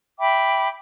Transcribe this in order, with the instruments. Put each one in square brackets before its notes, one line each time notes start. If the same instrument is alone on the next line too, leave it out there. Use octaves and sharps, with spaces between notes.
[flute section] E5 G5 B5 D6